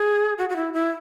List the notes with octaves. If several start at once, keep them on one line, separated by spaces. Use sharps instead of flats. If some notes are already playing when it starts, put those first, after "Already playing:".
Already playing: G#4
F#4
F#4
E4
E4